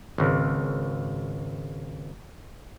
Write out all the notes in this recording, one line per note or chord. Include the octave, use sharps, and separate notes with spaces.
G#1 C#2